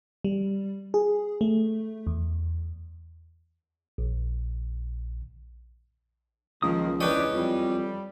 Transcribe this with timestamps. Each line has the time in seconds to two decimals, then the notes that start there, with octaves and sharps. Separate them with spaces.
0.24 G3
0.94 G#4
1.41 A3
2.07 E2
3.98 A#1
6.62 C#2 D#3 F3 A#3 D#6
7.01 E2 C#4 D4 G4 B4 C#5 D#5
7.35 F2 G3